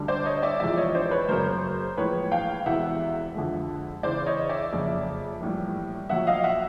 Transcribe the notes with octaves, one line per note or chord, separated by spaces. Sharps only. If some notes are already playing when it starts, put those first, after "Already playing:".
Already playing: D2 D3 G3
C5 D5
C#5 D#5
D5 E5
E2 C3 F3 G#3 D5 E5
C#5 D#5
C5 D5
B4 C#5
F#1 F#2 C#3 F#3 A#4 C5
A#1 A2 E3 G#3 B4 C#5
F5 G5
E1 E2 C3 E3 E5 F#5
F2 D3 F3 G#3
E2 C#3 E3 C5 D5
C#5 D#5
D5 E5
F#1 F2 C#3
A#1 A2 E3 G3
A#1 A#2 F#3 E5 F#5
D#5 F5
E5 F#5